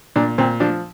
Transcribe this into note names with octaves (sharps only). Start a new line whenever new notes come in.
A#2 D4
A#2 C4
F3 D4